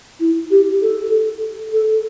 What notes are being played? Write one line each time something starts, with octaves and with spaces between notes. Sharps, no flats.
E4
G4
A4
A4